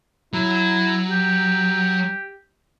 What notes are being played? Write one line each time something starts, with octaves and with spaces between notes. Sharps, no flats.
F#3 E4
G4